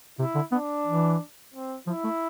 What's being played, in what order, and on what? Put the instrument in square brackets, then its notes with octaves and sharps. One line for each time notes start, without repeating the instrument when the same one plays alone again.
[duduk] C3 [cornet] E4
[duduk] D3
[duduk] B3 [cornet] D4
[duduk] E3
[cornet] C4
[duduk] F3 [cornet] E4
[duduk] A3